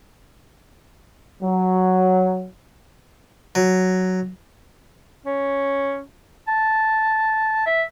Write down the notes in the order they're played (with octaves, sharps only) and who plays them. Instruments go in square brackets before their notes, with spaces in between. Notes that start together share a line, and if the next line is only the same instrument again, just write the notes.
[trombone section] F#3
[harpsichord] F#3
[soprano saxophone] C#4
A5
E5